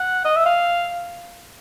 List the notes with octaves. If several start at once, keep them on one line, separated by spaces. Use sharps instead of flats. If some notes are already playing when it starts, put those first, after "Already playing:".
Already playing: F#5
D#5
E5
F5